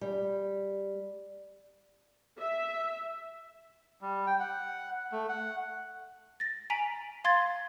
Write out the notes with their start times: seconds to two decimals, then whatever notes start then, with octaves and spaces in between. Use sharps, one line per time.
0.01 G3
2.38 E5
4.01 G3
4.27 G5
4.40 F#5
5.12 A3
5.29 F#5
6.40 A6 A#6
6.70 G#5 A#5 B6 D7 F#7
7.24 F5 C6 G#6 A6